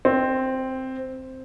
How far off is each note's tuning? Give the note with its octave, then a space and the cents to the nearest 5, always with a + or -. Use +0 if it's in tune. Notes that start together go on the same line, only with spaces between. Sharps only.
C4 +0